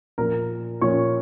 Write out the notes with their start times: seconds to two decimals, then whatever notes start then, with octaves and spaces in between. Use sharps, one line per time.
0.18 A#2 F3 A#4 A#5
0.81 A#2 F3 C#5 C#6